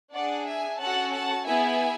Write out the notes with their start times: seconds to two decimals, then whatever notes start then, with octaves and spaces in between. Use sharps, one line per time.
0.13 D4 G#4 D5 F#5
0.46 E5 G#5
0.79 C#4 F#4 A4 F#5 A5
1.11 F#5 A5
1.45 B3 E4 G#4 E5 G#5